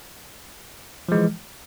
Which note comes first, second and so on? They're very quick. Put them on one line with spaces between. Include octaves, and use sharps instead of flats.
F3 G#3 E3